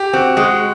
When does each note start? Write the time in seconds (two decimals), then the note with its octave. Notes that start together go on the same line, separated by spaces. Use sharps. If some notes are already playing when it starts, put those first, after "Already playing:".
Already playing: G4
0.13 C4 F#4
0.37 G#3 F#4